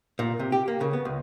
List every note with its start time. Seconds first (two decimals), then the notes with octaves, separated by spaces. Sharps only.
0.19 A#2
0.39 C3
0.52 G4
0.68 A#3
0.81 C#3
0.93 B3
1.05 C#2